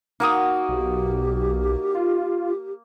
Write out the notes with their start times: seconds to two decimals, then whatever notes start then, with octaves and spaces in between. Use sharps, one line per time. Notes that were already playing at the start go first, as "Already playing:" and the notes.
0.20 A#3 D#4 F#4 D#6
0.69 B1 G4
1.94 F4